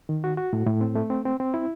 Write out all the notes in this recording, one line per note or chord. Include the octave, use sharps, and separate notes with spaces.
D#3
F#4
F#4
A2
A2
C4
A3
C4
C4
C4
E4